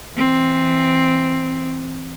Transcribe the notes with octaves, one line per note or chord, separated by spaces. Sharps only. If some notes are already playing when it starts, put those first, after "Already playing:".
E3 C4